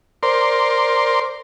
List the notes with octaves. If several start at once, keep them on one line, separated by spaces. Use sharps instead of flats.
A#4 C5 D5 C6